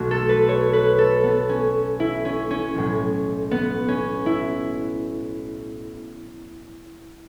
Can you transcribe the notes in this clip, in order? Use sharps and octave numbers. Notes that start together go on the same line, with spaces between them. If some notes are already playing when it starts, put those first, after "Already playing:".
Already playing: B1 B2 A3 F#4
A4
B4
C#5
B4
A4
B3
C#4
E4
C#4
C#4
B1 A2 F#3
B3
C#4
E4